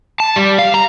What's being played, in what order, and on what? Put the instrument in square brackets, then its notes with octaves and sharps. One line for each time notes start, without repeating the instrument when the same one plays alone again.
[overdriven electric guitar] A5
G3
F5
A#5